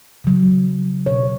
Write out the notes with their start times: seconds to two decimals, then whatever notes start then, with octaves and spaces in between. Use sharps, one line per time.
0.24 C#3 F#3
1.06 B2 F#3 C#5